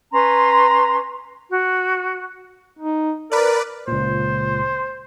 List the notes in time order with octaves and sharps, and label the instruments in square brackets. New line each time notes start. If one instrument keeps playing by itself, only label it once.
[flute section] C#4 B4 A#5 C6
F#4
[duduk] D#4
[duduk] A#4 [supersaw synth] B4 D5
[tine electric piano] C#2 A#2 [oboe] C5